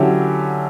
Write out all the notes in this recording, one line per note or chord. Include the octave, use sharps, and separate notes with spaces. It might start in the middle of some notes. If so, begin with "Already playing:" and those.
Already playing: D3 F#3 C#4 E4 G4